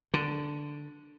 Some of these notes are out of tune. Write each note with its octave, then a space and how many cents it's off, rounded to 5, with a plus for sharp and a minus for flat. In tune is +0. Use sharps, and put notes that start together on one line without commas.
D3 +0